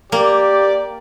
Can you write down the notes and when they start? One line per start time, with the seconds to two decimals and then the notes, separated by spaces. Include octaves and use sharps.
0.12 A#3 G4 D5